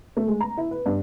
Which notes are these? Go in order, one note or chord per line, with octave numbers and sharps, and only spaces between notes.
A3
G#3
A#5
E4
B4
G2